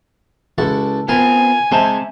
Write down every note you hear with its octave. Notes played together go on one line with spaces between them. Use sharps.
C#2 E4 F#4 A4 A5
B3 C4 F4 A#4 G#5
G#3 C4 C5 E5 A5 A#5